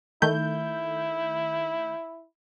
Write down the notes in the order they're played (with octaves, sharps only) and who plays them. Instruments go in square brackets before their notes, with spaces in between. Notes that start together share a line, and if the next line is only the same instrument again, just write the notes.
[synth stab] D#3 A3 G6 [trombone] E4